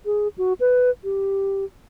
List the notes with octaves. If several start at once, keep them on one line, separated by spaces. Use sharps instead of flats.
G#4
F#4
B4
G4